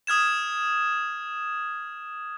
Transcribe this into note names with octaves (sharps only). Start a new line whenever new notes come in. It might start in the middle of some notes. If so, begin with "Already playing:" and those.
D#6 F6 G#6 E7